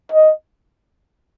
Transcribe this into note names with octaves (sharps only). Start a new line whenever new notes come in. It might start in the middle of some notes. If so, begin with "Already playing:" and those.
D#5